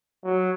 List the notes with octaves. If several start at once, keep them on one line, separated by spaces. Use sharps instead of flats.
F#3